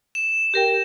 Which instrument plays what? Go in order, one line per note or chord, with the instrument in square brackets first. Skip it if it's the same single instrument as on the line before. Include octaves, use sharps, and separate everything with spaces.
[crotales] E7
[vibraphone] G4 A#4 G5